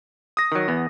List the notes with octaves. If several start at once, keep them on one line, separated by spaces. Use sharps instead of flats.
D#6 A#6
D#3 F#3
E2 B3